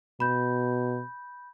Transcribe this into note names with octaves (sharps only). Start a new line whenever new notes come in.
B2 B5 G6